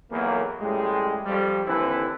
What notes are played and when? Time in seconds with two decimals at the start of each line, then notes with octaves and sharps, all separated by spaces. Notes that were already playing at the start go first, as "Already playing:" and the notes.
0.10 B1 E2 F#3 A#3
0.61 A1 A2 G3 G#3
1.25 F2 G3
1.66 D#2 D3 E3 C4 E4 B4